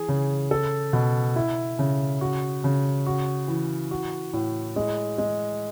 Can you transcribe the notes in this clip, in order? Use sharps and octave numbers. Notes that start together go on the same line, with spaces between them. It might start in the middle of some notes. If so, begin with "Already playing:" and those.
Already playing: E3 G#4
C#3
A4
B2
E4
C#3
F#4
C#3
F#4
E3
F#4
A2
G#3
G#3